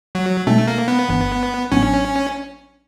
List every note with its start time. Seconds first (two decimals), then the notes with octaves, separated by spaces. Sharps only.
0.15 F#3
0.47 B2 G#3 A3 C4 D#4
0.67 A#3
0.88 B3
1.09 G1 G2 E3
1.72 A1 A2 F#3 B3 C#4 D4